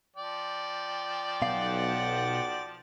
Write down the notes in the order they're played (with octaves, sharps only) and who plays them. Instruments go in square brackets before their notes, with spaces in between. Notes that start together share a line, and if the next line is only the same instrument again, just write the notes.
[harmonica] F3 D5 G5
[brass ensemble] B1 F#5 [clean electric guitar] B2 F5